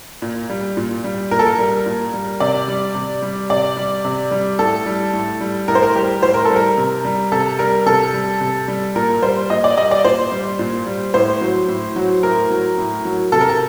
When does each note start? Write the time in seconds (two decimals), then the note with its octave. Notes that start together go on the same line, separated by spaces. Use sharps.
0.22 A#2
0.50 G3
0.77 A#2
1.04 G3
1.31 A#2 A#4
1.39 A4
1.47 A#4
1.59 G3
1.86 A#2
2.14 G3
2.40 C3 D5
2.68 G3
2.95 C3
3.22 G3
3.50 C3 D5
3.77 G3
4.05 C3
4.31 G3
4.59 A2 A4
4.86 G3
5.13 A2
5.41 G3
5.68 A2 A#4
5.75 C5
5.83 A#4
5.95 G3 G4
6.23 A2 C5
6.34 A#4
6.45 G3 A4
6.56 A#4
6.77 C3
7.05 G3
7.32 C3 A4
7.59 G3 A#4
7.86 C3 A4
8.14 G3
8.41 C3
8.68 G3
8.96 A#2 A#4
9.23 G3 C5
9.50 A#2 D#5
9.64 D5
9.77 G3 D#5
9.91 D5
10.05 A#2 C5
10.32 G3
10.59 A#2
10.87 G3
11.14 A2 C5
11.41 F#3
11.69 A2
11.96 F#3
12.23 A2 A#4
12.51 F#3
12.78 A2
13.05 F#3
13.32 C3 A4
13.41 A#4
13.49 A4